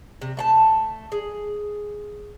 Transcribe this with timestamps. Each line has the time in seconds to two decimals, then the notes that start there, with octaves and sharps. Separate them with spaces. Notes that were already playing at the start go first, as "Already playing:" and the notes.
0.21 C3
0.37 A3 F#5 A5
1.12 G#4